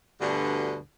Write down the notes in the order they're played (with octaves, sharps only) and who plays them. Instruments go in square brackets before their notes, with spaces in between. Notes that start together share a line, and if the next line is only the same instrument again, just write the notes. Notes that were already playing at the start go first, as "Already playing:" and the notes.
[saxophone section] D2 G2 B2 D3